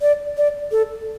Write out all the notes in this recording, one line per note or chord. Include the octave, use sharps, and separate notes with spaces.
D5
D5
A4